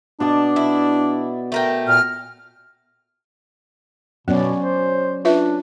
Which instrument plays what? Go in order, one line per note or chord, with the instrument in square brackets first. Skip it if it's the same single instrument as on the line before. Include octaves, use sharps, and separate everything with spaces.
[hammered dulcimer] B2 D5 A5 [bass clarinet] D4
[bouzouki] E4
A3 A#4 G5
[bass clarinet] A#2 [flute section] F6
[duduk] B2 [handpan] F#3 C#4 D5 [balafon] B3
[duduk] C5
[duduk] D4 [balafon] F4 B4 E5